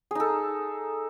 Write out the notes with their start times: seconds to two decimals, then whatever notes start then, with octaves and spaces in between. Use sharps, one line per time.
0.11 G#4
0.15 D#4
0.20 A4